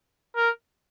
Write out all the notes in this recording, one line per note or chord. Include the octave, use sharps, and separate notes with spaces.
A#4